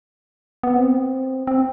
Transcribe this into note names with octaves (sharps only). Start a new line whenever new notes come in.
B3
C4
C4